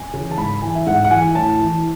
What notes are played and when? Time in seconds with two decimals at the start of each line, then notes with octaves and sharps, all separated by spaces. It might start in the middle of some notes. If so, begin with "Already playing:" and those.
Already playing: G#5
0.13 C#3 E3
0.31 A5
0.38 G#2 B5
0.62 E3 G#5
0.75 E5
0.86 G#2 F#5
1.04 F#5
1.11 E3 G#5
1.35 A2 A5
1.61 E3